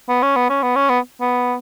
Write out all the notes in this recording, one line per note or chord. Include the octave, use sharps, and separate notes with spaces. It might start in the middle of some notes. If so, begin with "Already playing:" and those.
B3
C#4
B3
C#4
B3
C#4
B3
B3